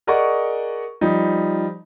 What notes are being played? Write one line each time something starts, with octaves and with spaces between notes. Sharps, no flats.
G#4 A#4 D5 D#5 F#5 C#6
F3 G3 D#4